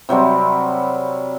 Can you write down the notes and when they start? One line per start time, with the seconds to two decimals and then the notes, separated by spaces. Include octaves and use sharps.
0.09 C3 F#3 G3 C4